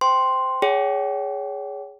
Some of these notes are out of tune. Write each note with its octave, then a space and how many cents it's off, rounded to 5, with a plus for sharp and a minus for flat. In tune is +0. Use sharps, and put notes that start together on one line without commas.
C5 -15 G5 +0 C6 +0
G#4 +0 C#5 +25 G5 -45